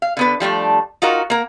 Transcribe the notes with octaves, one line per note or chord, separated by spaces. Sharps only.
F5
D3 B3 B4
F3 G3 A3 D4
D#4 F4 F#4 A#4
A#3 A#4